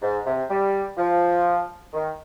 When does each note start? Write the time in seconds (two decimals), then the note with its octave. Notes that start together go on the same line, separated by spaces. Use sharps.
0.02 G#2
0.26 C3
0.49 G3
0.97 F3
1.93 D#3